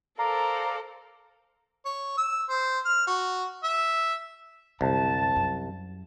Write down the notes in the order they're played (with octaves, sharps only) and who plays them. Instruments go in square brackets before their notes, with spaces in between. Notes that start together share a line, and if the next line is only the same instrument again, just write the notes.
[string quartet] A4 A#4 C5 [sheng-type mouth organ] D5 F5 [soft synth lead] A#5
[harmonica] C#5
E6
C5
F6
F#4
E5
[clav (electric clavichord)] C2 [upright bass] F#2 D3 [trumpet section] A5
[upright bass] F#2